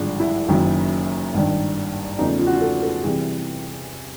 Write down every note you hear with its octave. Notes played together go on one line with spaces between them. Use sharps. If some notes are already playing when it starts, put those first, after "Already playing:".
Already playing: G#1 G2 D3 F3 G#3
E4
F#1 F#2 D#3
G#1 G2 D#3
E2 C#3 F3 A3 D#4
F4
F#4
F4
A4
A4
C3 E3 G3 G#4